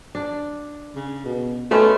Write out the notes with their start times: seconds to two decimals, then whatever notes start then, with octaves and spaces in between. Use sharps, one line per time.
0.15 D4
0.96 C#3
1.25 B2
1.71 G#3 A3 B3 C#4